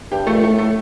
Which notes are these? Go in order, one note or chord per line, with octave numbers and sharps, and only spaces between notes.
G2 G4
A#2 A3
A2 A3
A2
A3
A2